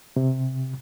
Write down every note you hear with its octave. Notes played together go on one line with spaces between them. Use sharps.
C3